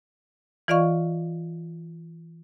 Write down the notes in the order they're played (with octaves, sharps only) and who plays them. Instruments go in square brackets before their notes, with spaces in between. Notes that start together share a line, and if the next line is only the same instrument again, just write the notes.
[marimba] E3 F4 D5 D#5 F5 C#6